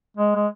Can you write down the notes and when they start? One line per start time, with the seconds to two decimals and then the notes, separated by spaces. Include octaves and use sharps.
0.17 G#3
0.35 G#3